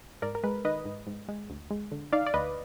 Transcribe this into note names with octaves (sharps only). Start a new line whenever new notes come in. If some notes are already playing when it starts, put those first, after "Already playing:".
G#2 A#4 D5
A#4
G#3 B4
D#3 B4 D#5
G#2
G#2
G#3
D2
G#3
D3
D#4 D5 F5
D5
D2 B4 D#5